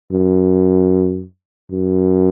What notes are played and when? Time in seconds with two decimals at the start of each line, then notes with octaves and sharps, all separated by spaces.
0.12 F#2
1.71 F#2